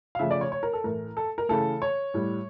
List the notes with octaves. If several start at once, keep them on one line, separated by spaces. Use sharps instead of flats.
F5
C#3 F3 A3 E5
D5
C#5
C#5
A#4
A4
A2 E3 A3 A#4
A4
A#4
C#3 E3 A3 A4
C#5
A2 G3